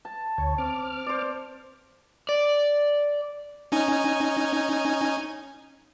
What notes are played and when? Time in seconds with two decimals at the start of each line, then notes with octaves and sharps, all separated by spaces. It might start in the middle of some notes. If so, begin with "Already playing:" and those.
0.05 A5
0.38 D2 C#5
0.58 C4 D6 F6
1.06 C5 D5
2.29 D5
3.72 C#4 D#4 G#5